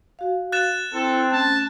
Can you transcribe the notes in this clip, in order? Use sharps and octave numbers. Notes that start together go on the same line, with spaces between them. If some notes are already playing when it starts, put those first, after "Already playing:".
F#4 F5
F#6 A6 E7
C4 E4 A4
A3 C#4 A5